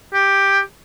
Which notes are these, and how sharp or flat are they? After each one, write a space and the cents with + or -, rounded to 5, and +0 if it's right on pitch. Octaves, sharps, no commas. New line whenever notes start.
G4 +5